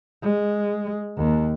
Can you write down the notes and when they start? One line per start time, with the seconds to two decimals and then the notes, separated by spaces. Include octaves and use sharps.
0.22 G#3
1.17 D#2